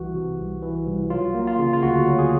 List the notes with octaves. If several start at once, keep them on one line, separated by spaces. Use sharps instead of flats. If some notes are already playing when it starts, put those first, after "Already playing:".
Already playing: C2 E3 F#4
C3
C2
E3
C2
F#3 F4
A#3
F4
C#3
F4
D2 F#4
F#3
G#4